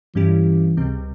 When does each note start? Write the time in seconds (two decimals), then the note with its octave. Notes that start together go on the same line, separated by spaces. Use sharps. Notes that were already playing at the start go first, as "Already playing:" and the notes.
0.15 G2 E3 G3 C#4 E4 G4
0.77 C#2 C3 G3 C4